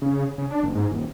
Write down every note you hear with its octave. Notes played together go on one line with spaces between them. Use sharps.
C#3
C#3
D4
F#1
G#2
D#1